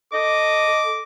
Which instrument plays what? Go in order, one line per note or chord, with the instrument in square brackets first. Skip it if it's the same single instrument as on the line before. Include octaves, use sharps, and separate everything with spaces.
[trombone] A4 [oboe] D#5 [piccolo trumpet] D6